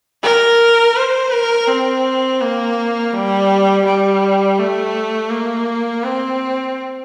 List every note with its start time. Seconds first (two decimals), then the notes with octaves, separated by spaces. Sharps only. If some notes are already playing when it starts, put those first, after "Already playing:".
0.24 A#4
0.96 C5
1.32 A#4
1.68 C4
2.41 A#3
3.13 G3
3.86 G3
4.59 A3
5.31 A#3
6.03 C4